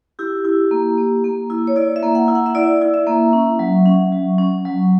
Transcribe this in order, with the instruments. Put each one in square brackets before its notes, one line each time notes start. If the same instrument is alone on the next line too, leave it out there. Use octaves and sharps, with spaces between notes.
[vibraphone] E4 G4
E4
A#3
A#3
A#3
E4
C#5
E4 D5
E5
A#3
F#5
E4
F#5
E5
E4 D5
E4
E5
A#3
C#4
F#3
C#4
F#3
C#4
F#3